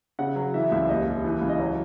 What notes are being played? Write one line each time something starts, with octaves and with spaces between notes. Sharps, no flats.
C#3 F#5
F#3
E3 E5
C#2 E5
D#2 D#5
D#2
E3
C#2
D#5
F#3 C#5